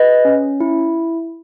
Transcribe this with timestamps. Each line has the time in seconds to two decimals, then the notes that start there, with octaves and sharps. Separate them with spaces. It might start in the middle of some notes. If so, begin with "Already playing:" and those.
Already playing: G#4 B4 D#5
0.25 C#4
0.60 E4